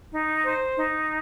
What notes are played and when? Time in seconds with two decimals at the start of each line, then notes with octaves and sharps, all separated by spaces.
0.11 D#4
0.43 C5
0.76 D#4